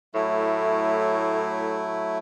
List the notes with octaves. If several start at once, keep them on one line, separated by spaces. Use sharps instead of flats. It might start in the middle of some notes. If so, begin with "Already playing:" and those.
A2 F#3 A3 E4